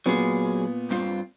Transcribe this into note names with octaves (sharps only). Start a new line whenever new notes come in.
A#2 F#3 B3 G#4
G2 C4 F4